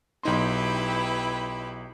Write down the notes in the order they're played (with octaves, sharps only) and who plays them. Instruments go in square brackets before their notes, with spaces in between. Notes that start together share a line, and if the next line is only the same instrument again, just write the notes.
[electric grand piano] B1 D#4 C6 [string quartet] E4 G4 B4